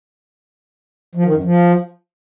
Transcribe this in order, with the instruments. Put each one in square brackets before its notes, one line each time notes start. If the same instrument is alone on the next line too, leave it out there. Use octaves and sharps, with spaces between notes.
[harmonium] F3
D#3
F#2
F3